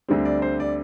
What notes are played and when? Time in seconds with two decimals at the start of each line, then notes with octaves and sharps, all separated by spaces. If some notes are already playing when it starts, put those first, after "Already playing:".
0.08 D2 D3 G3 C4
0.25 D5
0.42 C5
0.60 D5